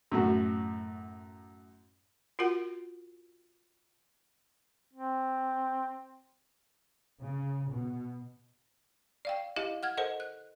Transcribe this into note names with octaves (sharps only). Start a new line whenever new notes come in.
F#2 A2 F#4
F4 F#4 A#4 F#5
C4
C#3
B2
D5 F5 G5
E4 G4 D#5 F5
F#5 F6 G#6
A4 A#4 C5 D#5 F#5
F#6